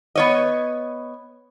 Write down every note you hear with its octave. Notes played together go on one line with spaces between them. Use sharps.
B3 C#5 D#5